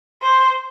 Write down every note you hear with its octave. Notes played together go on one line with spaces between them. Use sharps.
C5